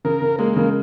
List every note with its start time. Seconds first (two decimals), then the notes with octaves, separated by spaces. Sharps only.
0.05 C#3 A#4
0.22 C#3
0.39 G#3 A#3
0.56 C#3